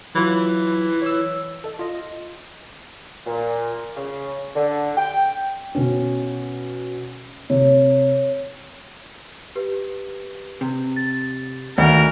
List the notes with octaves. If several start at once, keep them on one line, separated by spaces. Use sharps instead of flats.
E3 F#3 F4
C#5 E6
A4 D#5
F4 D#5
A#2
C#3
D3
G5
B2 C#4
C3 C#5
G4 B4
C3
A6
D2 D#3 A#4 F#5